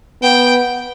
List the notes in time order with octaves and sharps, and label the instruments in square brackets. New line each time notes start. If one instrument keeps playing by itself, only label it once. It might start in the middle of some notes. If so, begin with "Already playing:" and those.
[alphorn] B3 [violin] G5